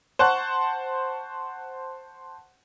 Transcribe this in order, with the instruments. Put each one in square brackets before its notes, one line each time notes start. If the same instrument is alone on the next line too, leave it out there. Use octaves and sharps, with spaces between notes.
[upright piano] C5 F#5 A5 C#6 F#6